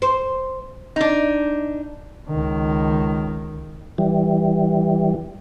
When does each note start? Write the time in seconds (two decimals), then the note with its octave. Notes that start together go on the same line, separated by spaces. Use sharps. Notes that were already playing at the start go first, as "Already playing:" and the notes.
0.02 C5
0.96 D4 D#4
2.29 C#2 D#3
3.98 E3 G3